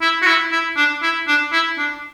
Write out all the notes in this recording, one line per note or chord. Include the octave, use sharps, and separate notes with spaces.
E4
F#4
E4
E4
D4
E4
D4
E4
D4